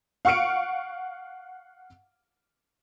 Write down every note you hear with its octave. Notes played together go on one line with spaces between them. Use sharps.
F5 F#5 C#6 F6 C#7 D7